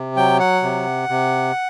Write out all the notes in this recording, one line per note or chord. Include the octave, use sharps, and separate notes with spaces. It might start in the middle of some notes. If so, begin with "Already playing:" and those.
Already playing: C3
F#3 G5
F#5
C3
C3